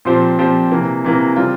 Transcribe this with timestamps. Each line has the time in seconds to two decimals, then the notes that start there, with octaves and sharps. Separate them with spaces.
0.05 A#2 F3 C4 G4 C5
0.38 A#2 F3 C4 G4 C5
0.72 C3 E3 A#3
1.04 C3 E3 A#3
1.36 C#3 G3 C4 F4